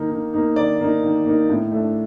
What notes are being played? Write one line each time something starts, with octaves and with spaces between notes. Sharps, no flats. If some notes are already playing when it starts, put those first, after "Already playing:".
Already playing: D#3 A#3 D#4
D#3
A#3 D#4
D#3 D5
A#3 D#4
D#3
A#3 D#4
A2
A3 D4